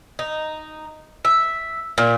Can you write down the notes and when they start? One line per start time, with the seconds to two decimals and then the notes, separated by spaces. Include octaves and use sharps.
0.19 D#4
1.25 E5
1.98 A#2